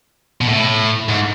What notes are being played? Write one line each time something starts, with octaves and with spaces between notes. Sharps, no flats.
B2
A2
G#2